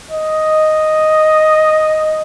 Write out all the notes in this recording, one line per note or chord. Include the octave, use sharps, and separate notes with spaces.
D#5